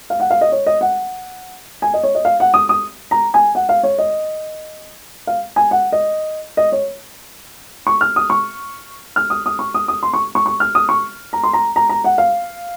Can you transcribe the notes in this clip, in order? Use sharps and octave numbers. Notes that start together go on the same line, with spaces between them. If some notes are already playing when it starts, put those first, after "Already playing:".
F5
F#5
F5
D#5
C#5
D#5
F#5
G#5
D#5
C#5
D#5
F5
F#5
D#6
D#6
A#5
G#5
F#5
F5
C#5
D#5
F5
G#5
F#5
D#5
D#5
C#5
C#6
F6
D#6
C#6
F6
D#6
D#6
C#6
D#6
D#6
C6
C#6
C#6
C#6
F6
D#6
C#6
A#5
C6
A#5
A#5
A#5
F#5
F5